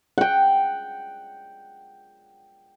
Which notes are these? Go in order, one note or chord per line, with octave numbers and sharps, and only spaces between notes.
F#5 G5